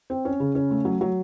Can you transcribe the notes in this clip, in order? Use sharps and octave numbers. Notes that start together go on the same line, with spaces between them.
C4
C#4
C#3
C#4
A3
F#3
F#3